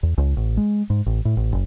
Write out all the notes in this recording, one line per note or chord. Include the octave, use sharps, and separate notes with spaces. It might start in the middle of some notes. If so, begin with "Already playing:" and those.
E2
C#2
A1
G#3
G#2
A1
A2
A1
F#1